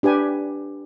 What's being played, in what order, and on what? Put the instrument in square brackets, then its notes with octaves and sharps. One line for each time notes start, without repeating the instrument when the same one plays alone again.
[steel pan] D4 G4 B4 G#5